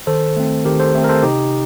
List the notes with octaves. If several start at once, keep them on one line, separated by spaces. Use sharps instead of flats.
D#3 A4 C5
A3 C4
D#3 G4 A#4
A4 C5
A3 C4
A#4
A4 C5
C3 D#4 G4